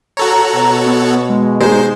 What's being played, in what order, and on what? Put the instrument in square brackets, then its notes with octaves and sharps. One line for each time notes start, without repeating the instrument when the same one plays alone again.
[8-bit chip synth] F#4 A4 C#5 [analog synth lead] A#5
[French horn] B2
[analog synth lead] B3
G#3
[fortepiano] G#3 [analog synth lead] D#4 [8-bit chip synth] C5